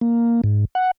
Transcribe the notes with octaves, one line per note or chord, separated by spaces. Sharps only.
A#3
G#2
F#5